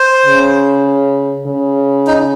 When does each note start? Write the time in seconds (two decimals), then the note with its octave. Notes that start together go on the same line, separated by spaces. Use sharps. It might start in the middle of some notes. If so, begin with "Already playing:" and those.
Already playing: C5
0.26 C#3
1.47 C#3
2.07 D#4